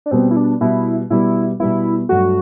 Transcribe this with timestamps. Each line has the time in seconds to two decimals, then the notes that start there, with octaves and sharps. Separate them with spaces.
0.06 D4
0.11 B2 G3 B3 C4
0.31 E4
0.36 D4
0.61 B2 G3 B3 E4
1.10 B2 G3 B3 E4
1.60 B2 G3 B3 E4
2.09 G2 F#3 A3 F#4